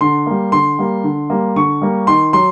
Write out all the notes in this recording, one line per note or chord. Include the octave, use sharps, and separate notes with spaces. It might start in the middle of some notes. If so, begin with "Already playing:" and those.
D3 C6
G3 A#3
D3 C6
G3 A#3
D3
G3 A#3
D3 C#6
G3 A#3
D#3 C6
F#3 C6